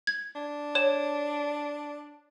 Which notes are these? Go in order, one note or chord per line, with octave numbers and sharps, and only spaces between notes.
G#6
D4
C#5 E7